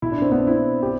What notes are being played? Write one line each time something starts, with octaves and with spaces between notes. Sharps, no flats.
B2 E4
D4
C4
B3 D4
C4 E4
G4